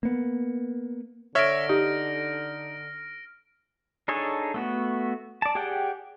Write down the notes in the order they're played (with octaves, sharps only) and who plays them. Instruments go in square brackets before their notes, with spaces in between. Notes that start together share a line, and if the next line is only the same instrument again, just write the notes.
[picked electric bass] A#3 B3
[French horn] D3 [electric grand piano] C#5 E5 [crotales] F6 A#6 D7
[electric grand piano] D#4 [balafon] G4
[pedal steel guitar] D4 D#4 G#4 A4 C#5
A3 B3 F#4
D5 A5
G4 G#4 D5 F#5 G5